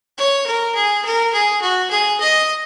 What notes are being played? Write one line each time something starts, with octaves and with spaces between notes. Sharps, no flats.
C#5
A#4
G#4
A#4
G#4
F#4
G#4
D#5